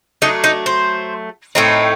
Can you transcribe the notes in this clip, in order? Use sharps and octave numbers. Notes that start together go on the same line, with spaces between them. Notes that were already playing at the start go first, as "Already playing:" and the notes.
F#3 A3 D4 D#4
D#4
C5
A2 A3 C4 D#4